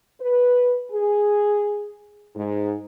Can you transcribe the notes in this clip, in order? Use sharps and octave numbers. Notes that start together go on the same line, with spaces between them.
B4
G#4
G#2